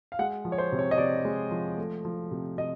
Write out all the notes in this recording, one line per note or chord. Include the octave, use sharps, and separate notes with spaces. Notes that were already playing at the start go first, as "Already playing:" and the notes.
F5
G#3 F#5
F3
C#5
C5
C3
C#5
D#5
C3 D5
G#3
F3
A3
F3
C3
C3 D#5